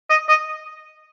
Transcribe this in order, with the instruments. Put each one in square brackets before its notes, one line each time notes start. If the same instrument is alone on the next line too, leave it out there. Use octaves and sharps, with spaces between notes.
[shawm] D#5
D#5